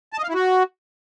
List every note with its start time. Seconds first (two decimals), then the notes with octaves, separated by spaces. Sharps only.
0.13 A5
0.18 D#5
0.24 F5
0.29 E4
0.34 F#4